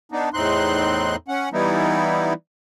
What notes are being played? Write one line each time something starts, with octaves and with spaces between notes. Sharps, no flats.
B3 D4 D#4
E2 A2 C4 D#4 C6 F#6
C#4 F#5
E3 G3 B3 D#4 E4